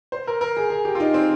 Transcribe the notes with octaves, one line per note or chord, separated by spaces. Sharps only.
C5
A#4
A#4
G#4
G#4
G4
F4
D#4
C4